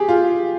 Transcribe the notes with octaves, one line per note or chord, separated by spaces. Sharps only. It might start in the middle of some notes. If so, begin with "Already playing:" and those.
Already playing: G4 G#4
F4